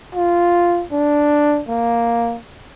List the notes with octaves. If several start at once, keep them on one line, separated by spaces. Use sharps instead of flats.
F4
D4
A#3